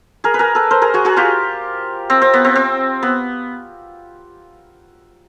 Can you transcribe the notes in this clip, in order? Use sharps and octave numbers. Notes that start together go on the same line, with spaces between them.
G#4 A#4
B4
G#4 A#4
A4 B4
A#4 C5
G#4 A#4
F#4 G#4
F#4 G#4
F4 G4
C4
C4
B3
C4
C4
B3